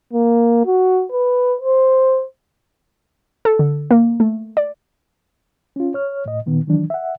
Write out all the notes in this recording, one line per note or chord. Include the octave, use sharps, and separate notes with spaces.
A#3
F#4
B4
C5
A4
D3
A#3
A3
D5
C#4 F4
C#5 F6
A2 D#5
A#2 D#3 B3
D#3 E3 F#3 D4
E5 F#5